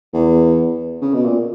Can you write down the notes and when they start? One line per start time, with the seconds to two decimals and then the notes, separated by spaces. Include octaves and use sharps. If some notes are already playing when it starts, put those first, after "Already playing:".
0.14 E2
1.02 C#3
1.14 B2
1.25 A#2